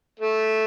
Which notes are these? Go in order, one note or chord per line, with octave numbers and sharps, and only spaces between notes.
A3